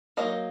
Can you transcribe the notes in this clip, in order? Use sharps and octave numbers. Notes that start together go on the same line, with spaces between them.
F#3 A#3 D#4 D#5